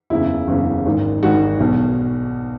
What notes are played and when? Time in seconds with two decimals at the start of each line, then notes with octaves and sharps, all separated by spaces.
0.10 F#1 E2 C#3 E4
0.47 F#1 E2 C#3
0.86 G#1 G#2 D#3
1.23 G#1 G#2 D#3 F#4
1.60 B1 B2